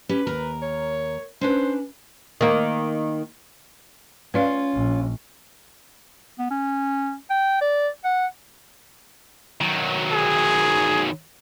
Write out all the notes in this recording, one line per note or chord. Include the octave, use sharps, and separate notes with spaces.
C#4 G4 B4
D#2 A#4 A#5
C#5
C#4 D4 B4 C5
D#3 A#3
C#4 F4 B4 D5 F5
A#1
B3
C#4
G5
D5
F#5
D#3 F#3
G#4